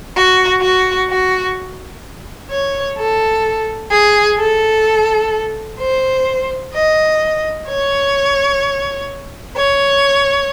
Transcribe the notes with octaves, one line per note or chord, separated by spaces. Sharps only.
F#4
F#4
F#4
C#5
A4
G#4
A4
C5
D#5
C#5
C#5